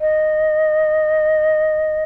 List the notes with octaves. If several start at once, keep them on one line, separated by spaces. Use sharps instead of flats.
D#5